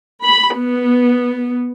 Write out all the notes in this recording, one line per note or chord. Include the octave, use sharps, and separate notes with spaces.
B5
B3